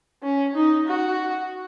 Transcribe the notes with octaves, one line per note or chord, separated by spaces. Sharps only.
C#4
D#4
F#4